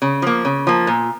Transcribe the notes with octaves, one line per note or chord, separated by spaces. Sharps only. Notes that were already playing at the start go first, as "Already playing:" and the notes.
C#3
F3 A#3
C#3
F3 A#3
A#2